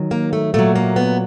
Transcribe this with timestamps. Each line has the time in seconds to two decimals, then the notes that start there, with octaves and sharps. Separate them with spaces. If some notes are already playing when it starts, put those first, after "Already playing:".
Already playing: D#3 F#3
0.11 A#3
0.33 A3
0.54 A#2 F#3 A3
0.75 A#3
0.96 B3